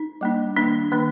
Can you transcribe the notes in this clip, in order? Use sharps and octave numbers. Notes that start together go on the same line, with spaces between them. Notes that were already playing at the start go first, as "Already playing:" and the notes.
Already playing: D#4
G3 A#3 D4
D#3 A#3 D4
D#3 A#3 D4